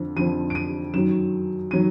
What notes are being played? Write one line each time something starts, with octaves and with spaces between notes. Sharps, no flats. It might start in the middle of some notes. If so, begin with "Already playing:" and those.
Already playing: F2 D3 F3
F2 D3 F3 D#7
D7
D#7
F#2 D#3 F#3 E7
D#3 F#3 D#7